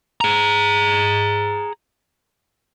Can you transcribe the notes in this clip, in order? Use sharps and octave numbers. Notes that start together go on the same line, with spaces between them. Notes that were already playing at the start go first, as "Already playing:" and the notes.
G#4 A#5